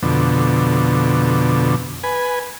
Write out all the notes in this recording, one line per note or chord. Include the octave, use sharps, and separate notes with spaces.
F2 B2 D3
B4 G#5